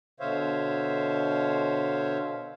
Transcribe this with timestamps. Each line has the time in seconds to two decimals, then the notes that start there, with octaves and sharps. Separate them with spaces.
0.20 B2 D3 C5 C#5 E5 F5